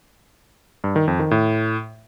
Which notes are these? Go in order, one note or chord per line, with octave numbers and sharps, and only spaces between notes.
G2
D#3
F2
D#3
A2